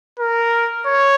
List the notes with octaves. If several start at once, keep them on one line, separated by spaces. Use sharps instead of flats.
A#4
C#5